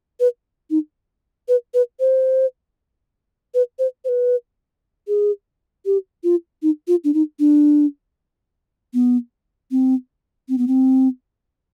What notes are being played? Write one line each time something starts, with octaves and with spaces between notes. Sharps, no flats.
B4
D#4
B4
B4
C5
B4
C5
C5
B4
G#4
G4
F4
D#4
F4
D4
D#4
D4
B3
C4
C4
B3
C4